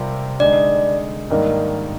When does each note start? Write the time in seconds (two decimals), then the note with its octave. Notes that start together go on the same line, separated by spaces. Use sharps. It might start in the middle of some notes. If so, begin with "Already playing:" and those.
Already playing: C3 G3 C4 F4 A#4
0.40 D3 G#3 D#4 D5
1.30 G#2 D#3 G3 A#3 D4